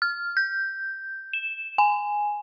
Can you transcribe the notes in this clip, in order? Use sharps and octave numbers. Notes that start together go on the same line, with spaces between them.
F6
G6
E7
G#5